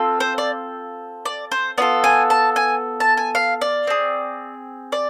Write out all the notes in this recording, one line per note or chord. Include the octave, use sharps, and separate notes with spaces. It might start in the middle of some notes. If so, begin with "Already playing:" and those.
Already playing: C4 F4 A4
C5
D5
D5
C5
B3 F4 A4 D5
G#5
A5
G#5
A5
G#5
F5
D5
C4 G#4
D5